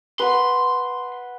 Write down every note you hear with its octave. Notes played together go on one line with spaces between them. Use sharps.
B4 F#5 C6